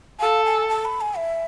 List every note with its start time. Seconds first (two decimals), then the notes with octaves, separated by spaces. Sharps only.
0.20 A4 F5
0.45 G#5
0.69 A5
0.85 B5
1.01 G#5
1.17 E5